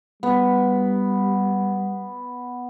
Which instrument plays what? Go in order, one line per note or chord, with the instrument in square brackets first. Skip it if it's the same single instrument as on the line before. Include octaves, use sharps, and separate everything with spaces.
[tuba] G3 [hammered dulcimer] B3